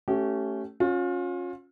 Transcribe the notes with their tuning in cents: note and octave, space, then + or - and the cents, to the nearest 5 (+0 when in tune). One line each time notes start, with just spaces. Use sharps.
A3 +0 C#4 +0 G4 -30
C#4 -10 F4 +35